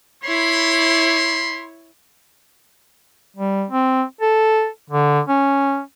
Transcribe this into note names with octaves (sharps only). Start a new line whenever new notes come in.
E4 C#5 B5 C6
G3
C4
A4
D3
C#4